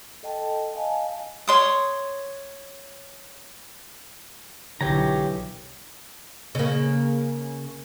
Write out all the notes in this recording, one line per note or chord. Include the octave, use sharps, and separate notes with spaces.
A4 D#5 G5 A5
D#5 F5 G#5 A5
C#5 C6 D#6
B1 D3 E3 G4 C#5 A#5
C#3 A#3